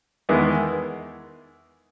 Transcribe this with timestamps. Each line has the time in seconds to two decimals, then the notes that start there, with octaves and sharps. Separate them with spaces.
0.29 E2 D#3 G#3 B3 E4